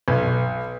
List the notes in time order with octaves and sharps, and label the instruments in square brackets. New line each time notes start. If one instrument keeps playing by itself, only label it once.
[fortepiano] B1